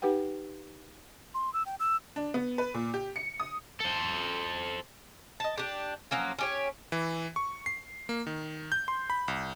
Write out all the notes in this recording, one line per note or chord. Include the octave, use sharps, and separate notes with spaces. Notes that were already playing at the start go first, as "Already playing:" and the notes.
D#4 G4 B4 F#5 G5
C6
E6
G5
E6
D4
B3
B4
A#2
G4
C#7
D#6
A4 C5
D#5 A5
D4 G4
F3 F#3 A#3 C#4
C#4 G4 C#5
E3
C#6
C7
A#3
D#3
G6
C6
B5
C2